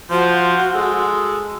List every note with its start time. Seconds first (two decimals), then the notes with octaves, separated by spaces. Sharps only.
0.10 F3 F#4 C5
0.75 G#3 A4